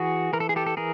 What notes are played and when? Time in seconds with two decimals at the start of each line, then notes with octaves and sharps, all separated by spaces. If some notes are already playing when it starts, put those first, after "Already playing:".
Already playing: E3 F#4 G#4
0.33 E3 A#4
0.40 A4
0.49 G#4
0.56 G4 A4
0.66 A4
0.77 E3 G#4 A#4